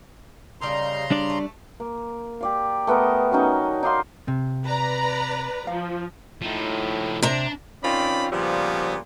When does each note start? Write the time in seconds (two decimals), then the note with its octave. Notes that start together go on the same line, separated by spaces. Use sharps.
0.61 C#3 G3 A#3 D#4 A#5 C6
1.11 G3 D4 D5
1.30 A3
1.80 A#3
2.41 G4 D5 F5
2.87 A3 B3 A#4 D#5
3.32 F#3 C#4 D#4 A#5
3.83 D#4 D5 F5 C6
4.28 C3
4.65 B4 D5 A#5
5.67 F3 F5
6.42 A2 F3 D#4
7.23 C3 D4 A#5
7.83 D#3 C4 C#4 F4 D5 B5
8.31 A#2 C#3 F3 G3 B3 C4